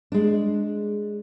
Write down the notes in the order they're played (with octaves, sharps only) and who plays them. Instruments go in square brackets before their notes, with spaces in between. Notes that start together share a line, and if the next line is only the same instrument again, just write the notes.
[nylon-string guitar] G#3 D4